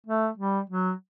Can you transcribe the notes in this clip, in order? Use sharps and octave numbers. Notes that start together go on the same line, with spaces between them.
A3
G3
F#3